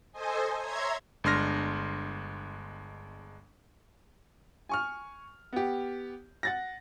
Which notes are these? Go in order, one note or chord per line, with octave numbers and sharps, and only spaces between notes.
A4 C5 D#5 G#5
C#5 E5 A#5 C6 G#6
G1 G#3 D4 C6 F6 A#6
G#5 C#6 F6
B3 G4
F#5 A6 A#6